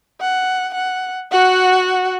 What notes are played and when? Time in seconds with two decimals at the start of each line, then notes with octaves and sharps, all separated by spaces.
0.20 F#5
0.74 F#5
1.31 F#4 F#5